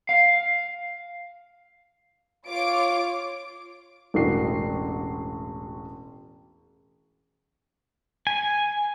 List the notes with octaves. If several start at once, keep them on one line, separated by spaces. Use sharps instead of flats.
F5
F4 C#5 D6 D7
E1 A1 F#4 C7
G#5